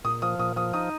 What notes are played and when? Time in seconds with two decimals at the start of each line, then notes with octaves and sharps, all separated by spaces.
0.04 A#2 D#6
0.22 F3 D#6
0.39 A#2 D#6
0.56 F3 D#6
0.74 D#4 D#6